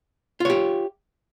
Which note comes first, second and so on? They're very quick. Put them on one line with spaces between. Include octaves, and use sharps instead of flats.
F4 C#5 G4